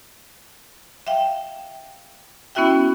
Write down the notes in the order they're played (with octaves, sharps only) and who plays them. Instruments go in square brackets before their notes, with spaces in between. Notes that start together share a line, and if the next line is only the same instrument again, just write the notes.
[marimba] E5 F5 G5
B3 C#4 E4 F#4 E5 G5